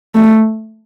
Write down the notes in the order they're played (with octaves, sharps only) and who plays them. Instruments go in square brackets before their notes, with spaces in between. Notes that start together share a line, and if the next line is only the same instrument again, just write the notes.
[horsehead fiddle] A3